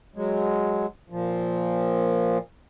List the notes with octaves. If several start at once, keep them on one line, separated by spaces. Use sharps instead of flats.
F#3 G#3
A#2 F3